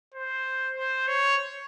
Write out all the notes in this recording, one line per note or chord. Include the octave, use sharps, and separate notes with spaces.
C5
C5
C#5